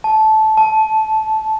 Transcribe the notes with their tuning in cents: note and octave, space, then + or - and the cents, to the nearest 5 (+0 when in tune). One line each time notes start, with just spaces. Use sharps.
A5 -15
A5 -5